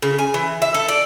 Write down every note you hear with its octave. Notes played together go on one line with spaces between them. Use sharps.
C#3
G#5
E3
E5
A4
D5